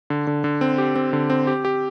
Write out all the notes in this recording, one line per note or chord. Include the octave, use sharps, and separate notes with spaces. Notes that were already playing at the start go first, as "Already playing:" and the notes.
D3
D3
D3
C4
G4
C4
D3
C4
G4
G4